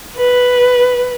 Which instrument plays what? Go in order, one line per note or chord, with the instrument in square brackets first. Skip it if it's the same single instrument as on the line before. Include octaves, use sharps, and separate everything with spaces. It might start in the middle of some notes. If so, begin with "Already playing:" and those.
[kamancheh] B4